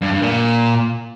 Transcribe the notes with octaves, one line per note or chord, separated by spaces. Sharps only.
G2
G2
A#2